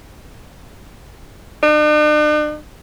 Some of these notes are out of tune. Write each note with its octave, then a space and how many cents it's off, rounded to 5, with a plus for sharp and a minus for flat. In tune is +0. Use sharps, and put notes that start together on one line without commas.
D4 +45